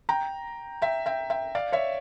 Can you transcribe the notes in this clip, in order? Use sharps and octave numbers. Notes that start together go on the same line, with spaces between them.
G5 A#5
E5 G5
E5 G5
E5 G5
D5 F5
C#5 E5